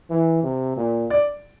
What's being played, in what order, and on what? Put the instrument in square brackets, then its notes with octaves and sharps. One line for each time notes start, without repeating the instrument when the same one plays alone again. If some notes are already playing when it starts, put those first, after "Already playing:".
[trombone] E3
C3
A#2
[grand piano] D5